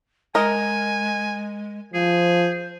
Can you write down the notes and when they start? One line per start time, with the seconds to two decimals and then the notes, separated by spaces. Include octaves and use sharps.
0.35 G#3 A#4 D#5 G#5
1.94 F3 G#4 C5